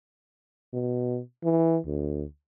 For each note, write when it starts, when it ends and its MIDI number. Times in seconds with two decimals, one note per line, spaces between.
0.73 1.20 47
1.44 1.78 52
1.86 2.24 38